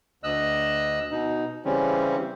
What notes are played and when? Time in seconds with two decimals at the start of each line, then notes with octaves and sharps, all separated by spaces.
0.24 D2 D#5 E6 F#6
1.11 B2 D#4
1.65 C#3 E3 G3 C4 C#4